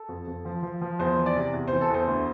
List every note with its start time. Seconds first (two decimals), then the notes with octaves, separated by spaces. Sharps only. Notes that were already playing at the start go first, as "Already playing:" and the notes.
Already playing: A4
0.09 F2
0.27 F2
0.45 F3
0.63 F3
0.81 F3
0.99 E2 C5
1.17 E3
1.26 D5
1.36 C3
1.53 E2
1.68 C5
1.72 E3
1.81 A4
1.90 E2 C5
2.08 D2